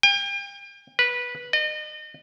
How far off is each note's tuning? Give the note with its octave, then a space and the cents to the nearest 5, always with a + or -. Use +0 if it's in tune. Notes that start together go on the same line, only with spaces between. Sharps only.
G5 +40
B4 -15
D#5 -35